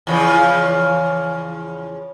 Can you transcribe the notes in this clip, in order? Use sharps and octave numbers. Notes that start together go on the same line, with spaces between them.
E2 C#3 F3